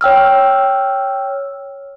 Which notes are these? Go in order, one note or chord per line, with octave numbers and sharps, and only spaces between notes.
C#5 G5 E6 F6